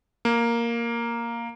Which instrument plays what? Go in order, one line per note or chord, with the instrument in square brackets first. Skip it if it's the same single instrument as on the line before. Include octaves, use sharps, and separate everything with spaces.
[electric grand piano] A#3